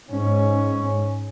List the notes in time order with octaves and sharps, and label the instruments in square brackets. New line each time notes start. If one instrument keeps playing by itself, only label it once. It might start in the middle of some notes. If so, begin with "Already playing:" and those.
[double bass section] G#2 C#4